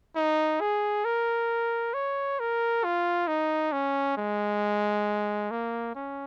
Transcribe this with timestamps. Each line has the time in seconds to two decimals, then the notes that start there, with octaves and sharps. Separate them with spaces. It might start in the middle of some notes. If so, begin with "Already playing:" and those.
0.16 D#4
0.61 G#4
1.05 A#4
1.94 C#5
2.39 A#4
2.84 F4
3.28 D#4
3.72 C#4
4.18 G#3
5.51 A#3
5.95 C#4